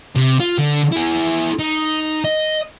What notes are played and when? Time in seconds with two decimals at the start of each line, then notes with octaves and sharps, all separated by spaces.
0.16 C3
0.40 F4
0.58 D3
0.92 E4 G#4
1.59 D#4
2.25 D#5